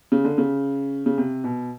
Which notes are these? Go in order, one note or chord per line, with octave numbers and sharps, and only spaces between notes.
C#3
D3
C#3
C#3
C3
B2